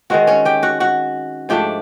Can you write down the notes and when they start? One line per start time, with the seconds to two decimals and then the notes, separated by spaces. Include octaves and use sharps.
0.10 D#3 G#3 C4 F#4 F#5
0.27 C#4 C#5
0.45 G4 G5
0.63 F#4 F#5
0.80 F#4 F#5
1.49 G#2 F3 A3 D4 G4 G5